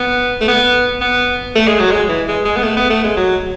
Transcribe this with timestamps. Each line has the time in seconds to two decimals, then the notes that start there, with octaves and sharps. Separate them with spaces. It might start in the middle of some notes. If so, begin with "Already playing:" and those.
Already playing: B3
0.41 A3
0.48 B3
1.01 B3
1.55 A3
1.67 G#3
1.79 F#3
1.91 G#3
2.09 E3
2.28 G#3
2.45 G#3
2.56 B3
2.63 A3
2.76 B3
2.90 A3
3.04 G#3
3.17 F#3